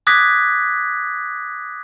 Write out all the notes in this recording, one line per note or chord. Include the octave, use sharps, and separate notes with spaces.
D6 D#6 F#6 G#6 A#6 B6